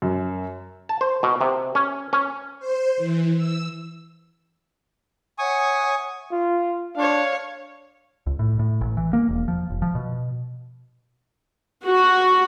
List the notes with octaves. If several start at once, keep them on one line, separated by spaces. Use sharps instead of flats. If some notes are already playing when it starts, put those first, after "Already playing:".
F#2
A5
C5
B2
C3
C#4
C#4
C5
E3
E6
C#5 E5 F#5 G#5 C#6 D#6
F4
D4 C#5 F5
C#2
A2
A2
A1
E3
A#3
E1
F3
F1
F3
B2
F#4